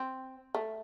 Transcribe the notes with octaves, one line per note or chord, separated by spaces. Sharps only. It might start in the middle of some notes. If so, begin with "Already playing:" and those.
Already playing: C4
A3